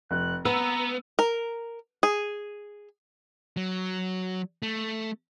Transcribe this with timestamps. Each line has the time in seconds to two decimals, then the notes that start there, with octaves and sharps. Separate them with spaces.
0.11 F1 F#6
0.45 B3 B4 A#5 E6
1.19 A#4
2.03 G#4
3.57 F#3
4.62 A3